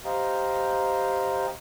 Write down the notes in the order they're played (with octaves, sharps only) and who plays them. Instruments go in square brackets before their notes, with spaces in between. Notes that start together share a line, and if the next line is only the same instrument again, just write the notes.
[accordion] G4 C5 D#5 F5 G5 A#5